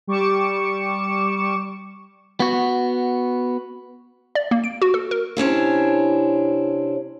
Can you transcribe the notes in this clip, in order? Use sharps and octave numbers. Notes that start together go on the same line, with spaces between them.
G3 C#6 D6 C#7 E7
B3 F#4
D5
A#3
D7
F#4
A4
A#4
C3 C#4 D4 E4